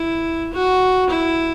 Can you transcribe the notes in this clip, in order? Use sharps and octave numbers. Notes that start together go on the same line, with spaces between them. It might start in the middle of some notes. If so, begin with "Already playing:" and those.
Already playing: E4
F#4
E4